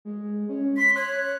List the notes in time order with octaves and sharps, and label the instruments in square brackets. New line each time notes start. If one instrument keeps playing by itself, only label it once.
[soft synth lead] G#3
C#4
[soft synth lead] C6 [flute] B6
[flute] C#5 [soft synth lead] F#6